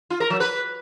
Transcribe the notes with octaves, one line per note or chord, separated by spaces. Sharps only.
F4
A#4
F#3
B4